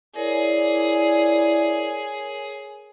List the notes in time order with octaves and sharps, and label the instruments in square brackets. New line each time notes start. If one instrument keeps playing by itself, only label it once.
[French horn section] E4 D5 [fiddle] G#4 [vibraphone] A#4 C#5